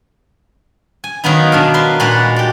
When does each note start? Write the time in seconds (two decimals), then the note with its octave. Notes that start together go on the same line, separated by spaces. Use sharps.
1.04 G#5
1.24 D#3 F#3 A#3 B3 D#4
1.52 B2 D4 F5
1.74 A#4 B4 C6
2.00 A#2 G#3 F#4 B4 A#5
2.36 G4 D5